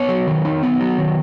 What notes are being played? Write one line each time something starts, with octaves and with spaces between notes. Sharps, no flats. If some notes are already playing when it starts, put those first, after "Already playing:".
Already playing: B3 C#5
F#3
D#3
D#4
B3
F#3
D#3